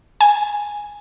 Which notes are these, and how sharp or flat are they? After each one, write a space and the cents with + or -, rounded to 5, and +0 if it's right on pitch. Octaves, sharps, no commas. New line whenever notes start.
G#5 -5